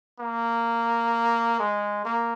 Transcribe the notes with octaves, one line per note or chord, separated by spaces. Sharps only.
A#3
G#3
A#3